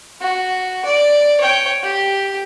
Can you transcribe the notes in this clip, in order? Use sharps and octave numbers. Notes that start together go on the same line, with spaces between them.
F#4
D5
C#5 G5
G4